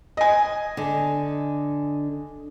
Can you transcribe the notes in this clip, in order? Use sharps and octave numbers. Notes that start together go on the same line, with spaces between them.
D#5 G#5
D3